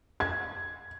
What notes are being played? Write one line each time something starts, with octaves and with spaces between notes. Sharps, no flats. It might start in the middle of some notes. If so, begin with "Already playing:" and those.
G#6